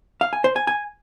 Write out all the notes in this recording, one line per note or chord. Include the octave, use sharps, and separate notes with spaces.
F5
G#5
C5
G#5
G#5